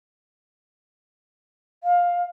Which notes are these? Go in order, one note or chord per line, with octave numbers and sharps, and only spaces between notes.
F5